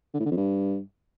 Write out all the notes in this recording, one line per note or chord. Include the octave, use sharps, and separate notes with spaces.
D3
A2
D3
F2
G2